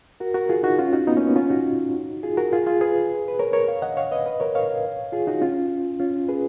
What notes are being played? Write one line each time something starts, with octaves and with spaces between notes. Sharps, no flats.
F#4 A#4
F#4 A#4
F4 G#4
D#4 F#4
C#4 F4
D#4 F#4
B3 D#4
A#3 C#4
B3
C#4 F4
D#4 F#4
F4 G#4
F#4 A#4
F4 G#4
F4 G#4
G#4 B4
B4
A#4 C#5
A#4 C#5
C#5 F5
D#5 F#5
C#5 F5
B4 D#5
B4 D#5
A#4 C#5
C#5 F5
F4 G#4
D#4 F#4
C#4 F4
C#4 F4
G#4 B4